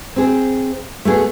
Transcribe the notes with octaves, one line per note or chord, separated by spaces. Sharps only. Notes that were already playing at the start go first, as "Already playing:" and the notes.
C4 G#4
A3 B3 G#4